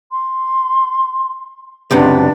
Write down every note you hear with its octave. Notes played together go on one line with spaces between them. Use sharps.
C6
C#2 F#2 C3 D4 B4